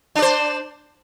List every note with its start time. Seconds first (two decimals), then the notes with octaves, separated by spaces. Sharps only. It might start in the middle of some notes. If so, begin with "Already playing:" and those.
0.15 D4
0.19 D5
0.22 C5